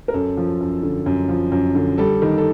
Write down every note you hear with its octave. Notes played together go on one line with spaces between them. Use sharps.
A#4
F#2 A4
F3
F#2
D3
F#2
F3
F#2
D3
G3 A4
D#3
A4